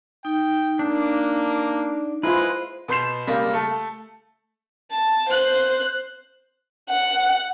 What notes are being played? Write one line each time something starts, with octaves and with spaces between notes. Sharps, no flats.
D#4 G5
A#3 D4
G#3 E4 F4 B4 C5
B2 B3 C6 G6 C7 E7
C#3 G3 G#3 A#3
A3 A4
A5
C5 F#6
F#5